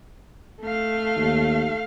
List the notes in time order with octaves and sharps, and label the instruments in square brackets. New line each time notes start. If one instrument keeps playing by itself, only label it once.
[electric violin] A3 F5
[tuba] D#2